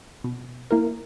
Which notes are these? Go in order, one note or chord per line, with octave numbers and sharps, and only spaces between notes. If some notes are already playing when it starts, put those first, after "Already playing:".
B2
A#3 E4 A#4